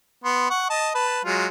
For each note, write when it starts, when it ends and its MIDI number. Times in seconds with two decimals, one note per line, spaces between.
0.24 0.46 59
0.24 0.46 84
0.50 0.69 78
0.50 0.69 85
0.70 0.90 75
0.70 0.90 81
0.95 1.20 71
0.95 1.20 81
1.25 1.47 54
1.25 1.47 56
1.25 1.47 65